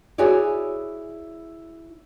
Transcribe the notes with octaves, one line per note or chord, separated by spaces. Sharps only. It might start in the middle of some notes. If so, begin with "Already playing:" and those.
E4 F#4 G#4 C#5 D5